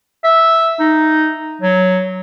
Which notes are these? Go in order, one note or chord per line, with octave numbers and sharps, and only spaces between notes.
E5
D#4
F#3